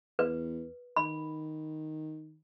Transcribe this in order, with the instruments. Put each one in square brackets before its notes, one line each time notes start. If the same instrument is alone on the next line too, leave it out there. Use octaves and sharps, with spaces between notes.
[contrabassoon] E2 [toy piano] B4
[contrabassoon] D#3 [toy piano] B5